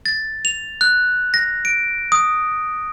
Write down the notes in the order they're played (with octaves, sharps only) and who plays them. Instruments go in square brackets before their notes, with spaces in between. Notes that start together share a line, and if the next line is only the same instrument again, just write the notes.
[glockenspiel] A6
F7
F#6
A#6
D7
D#6